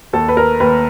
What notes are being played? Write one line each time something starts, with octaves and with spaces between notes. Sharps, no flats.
D#2 A4
B4
A#4
D#2 B4